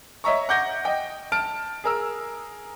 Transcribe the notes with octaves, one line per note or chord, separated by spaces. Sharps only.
C#5 D#5 E5 A#5 C#6
F#5 D6 G6 A#6
D#5 G5
A5 F6 D7
G#4 A#4 E6